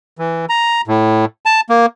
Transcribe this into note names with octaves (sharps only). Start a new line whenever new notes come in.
E3
A#5
A2
A5
A#3